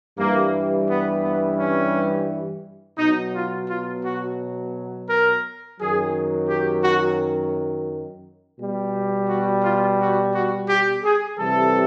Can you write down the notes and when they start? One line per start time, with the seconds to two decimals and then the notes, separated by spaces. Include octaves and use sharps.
0.18 G2 E3 G3 A#3
0.88 B3
1.23 B3
1.58 C#4
2.98 B2 F#3 D#4
3.34 F4
3.68 F4
4.04 F#4
5.09 A#4
5.79 F#2 D#3 F#3 G#4
6.48 G4
6.83 F#4
8.59 B2 G3
9.29 F#4
9.64 F4
9.99 F#4
10.33 F#4
10.68 G4
11.04 G#4
11.38 C3 E3 G3 A4